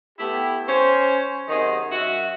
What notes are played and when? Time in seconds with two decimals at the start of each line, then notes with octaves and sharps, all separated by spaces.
0.19 A3 B3 E4 G4
0.68 C#4 C5
1.49 F#2 C3 D#3 G#4 C5 D#5
1.91 F#2 F#4 E5